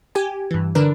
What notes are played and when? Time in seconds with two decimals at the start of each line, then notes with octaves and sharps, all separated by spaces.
0.15 G4 G#5
0.51 G2 E3
0.75 D3 D4 A#4 B4